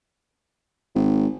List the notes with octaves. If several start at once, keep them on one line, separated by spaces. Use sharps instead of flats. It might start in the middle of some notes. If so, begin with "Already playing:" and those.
G#1